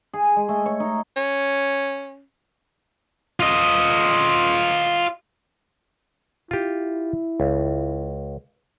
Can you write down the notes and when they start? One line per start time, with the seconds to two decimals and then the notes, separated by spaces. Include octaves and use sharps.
0.13 G#4
0.36 G#3
0.49 A3
0.66 C#5
0.80 D#4
1.16 C#4
3.40 F4 D#5
6.51 E4 F4 G4
7.40 C#2